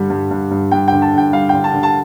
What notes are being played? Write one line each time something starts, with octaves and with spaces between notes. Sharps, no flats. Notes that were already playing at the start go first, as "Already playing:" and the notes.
Already playing: G2 D3 G3
G2
G2
G2
G2 G5
D3 G5
A5
D3 G5
G3 F5
D3 G5
A5
D3
A5